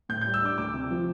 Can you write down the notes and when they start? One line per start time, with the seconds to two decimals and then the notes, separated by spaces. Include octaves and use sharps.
0.09 A2 G6
0.21 G6
0.26 G3
0.34 E6
0.42 D4 D6
0.58 D2 D6
0.74 C3
0.90 F3